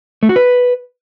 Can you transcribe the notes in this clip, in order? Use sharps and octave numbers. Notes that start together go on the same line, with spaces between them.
A3
F#4
B4